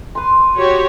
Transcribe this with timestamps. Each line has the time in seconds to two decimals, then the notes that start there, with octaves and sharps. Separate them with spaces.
0.15 B4 C6
0.56 F#4 G4 C#5